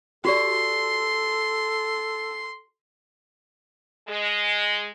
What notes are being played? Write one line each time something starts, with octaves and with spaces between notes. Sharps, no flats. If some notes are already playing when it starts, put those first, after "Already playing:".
F#4 G4 A4 D5 C6
G#3